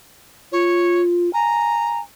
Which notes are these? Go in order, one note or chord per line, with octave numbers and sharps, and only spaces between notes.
F4 C#5
G#5 A#5